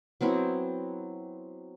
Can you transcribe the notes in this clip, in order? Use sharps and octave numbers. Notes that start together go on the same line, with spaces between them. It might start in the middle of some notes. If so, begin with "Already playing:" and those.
F#3 B3 C4 E4